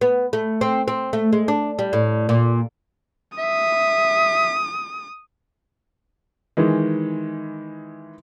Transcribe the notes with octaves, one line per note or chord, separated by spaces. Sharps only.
B3
A3
C4
C4
A3
G#3
D4
G3
A2
A#2
E5 D#6
D#3 E3 G#3